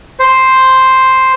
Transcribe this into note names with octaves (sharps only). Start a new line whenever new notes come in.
C5